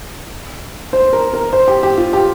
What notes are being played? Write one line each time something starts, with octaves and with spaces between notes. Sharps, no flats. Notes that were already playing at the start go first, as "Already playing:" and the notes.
C5
A#4
A#4
C5
G4
G4
F4
G4